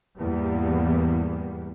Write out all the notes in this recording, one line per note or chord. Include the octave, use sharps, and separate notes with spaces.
E2 G#2 G3 A#3 B3